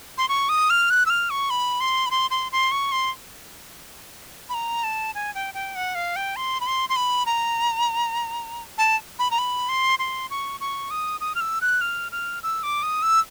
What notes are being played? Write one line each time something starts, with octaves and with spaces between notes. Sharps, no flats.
C6
C#6
D#6
F6
F#6
E6
F6
C#6
B5
C6
B5
C6
C6
C6
C#6
C6
B5
A#5
A5
G#5
G5
G5
F#5
F5
G5
C6
B5
C6
C6
B5
A#5
A5
B5
A#5
B5
C6
C6
C#6
C#6
D#6
D#6
F6
E6
F#6
F6
F6
E6
D6
D#6
E6